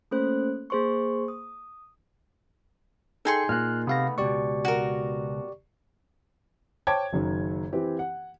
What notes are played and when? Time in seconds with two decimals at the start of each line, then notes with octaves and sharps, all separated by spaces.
0.11 A3 A#3 C#4 A4 C5 F#6
0.70 A#3 G#4 C5 C6 C#6
1.28 D#6
3.25 D#4 G#4 A4 G5 C6 C#7
3.49 A#2 F6 F#6
3.87 C3 A3 B3 F5 A#6
4.18 C#2 B2 G4 D5 C#6
4.65 F#4 A#4
6.87 C5 C#5 G5 A5 D6 G#6
7.12 F#1 F#2 D#3
7.73 E3 C4 G4
7.99 F#5